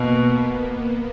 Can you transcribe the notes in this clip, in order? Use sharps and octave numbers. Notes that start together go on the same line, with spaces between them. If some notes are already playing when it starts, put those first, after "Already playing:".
Already playing: B2 A#3 B3